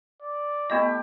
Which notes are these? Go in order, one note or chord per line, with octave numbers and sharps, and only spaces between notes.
D5
A3 B3 E4 G4 D#5